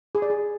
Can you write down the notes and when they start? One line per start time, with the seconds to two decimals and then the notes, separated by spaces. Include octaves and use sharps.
0.15 G#4
0.22 D5
0.30 G#4